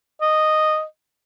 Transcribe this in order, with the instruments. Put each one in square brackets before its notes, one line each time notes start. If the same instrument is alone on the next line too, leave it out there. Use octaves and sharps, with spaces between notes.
[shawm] D#5